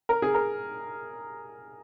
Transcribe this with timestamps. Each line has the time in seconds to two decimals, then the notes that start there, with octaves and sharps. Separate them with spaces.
0.09 A#4
0.22 G#4
0.34 A#4